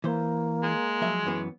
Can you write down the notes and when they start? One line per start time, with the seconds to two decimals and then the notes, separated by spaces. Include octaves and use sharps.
0.04 E3 A#3 C5
0.63 G#3
1.02 F3 F#3 E5
1.26 F#2 E3 B3